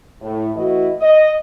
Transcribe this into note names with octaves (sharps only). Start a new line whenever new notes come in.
A2
E3 A3 E4 F#4 D#5
D#5